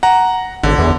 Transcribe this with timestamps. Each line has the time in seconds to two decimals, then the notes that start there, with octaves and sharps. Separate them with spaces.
0.03 F#5 A#5
0.63 G#1 D3
0.78 E2